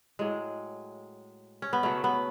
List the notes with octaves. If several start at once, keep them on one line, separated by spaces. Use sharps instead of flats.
A2 F#3 G#3
C#4
B3
C#3 F#3 A3
B3